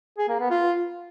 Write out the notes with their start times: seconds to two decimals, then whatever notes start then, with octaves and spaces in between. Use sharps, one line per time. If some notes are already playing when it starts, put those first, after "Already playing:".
0.18 G#4
0.29 A#3
0.40 B3
0.50 F4